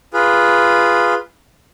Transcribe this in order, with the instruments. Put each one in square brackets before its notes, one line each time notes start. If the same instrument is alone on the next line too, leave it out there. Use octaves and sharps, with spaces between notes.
[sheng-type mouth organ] F4 G#4 B4